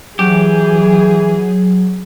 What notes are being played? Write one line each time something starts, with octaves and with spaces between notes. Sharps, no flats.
E3 F#3 G4 G#4